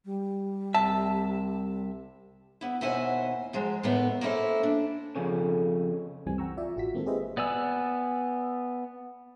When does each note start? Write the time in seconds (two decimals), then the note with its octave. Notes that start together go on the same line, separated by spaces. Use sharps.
0.05 G3
0.74 C2 C3 E5 A5
2.61 B3 E4
2.81 D#2 B2 E4 C5 F#5 G#5
3.53 F3 F#3 G#3
3.83 A2 D#3 A3 B3
4.21 A#3 C#4 D#4 E4 A4 C5
4.63 D4
5.16 F2 C#3 C#4 A4
6.26 C2 F#2 E3 G3 C4 G#5
6.38 F#5 G5 A#5 C#6 E6
6.57 F4 D5 E5
6.76 A1 F4 F#4 B6
6.93 D#3 G#3 A#3 C4 F4 A4
7.06 G4 G#4 B4 C5 D#5 E5
7.37 B3 D5 G#5 E6